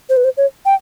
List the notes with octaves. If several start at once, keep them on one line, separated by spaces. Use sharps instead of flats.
C5
B4
C5
C#5
G5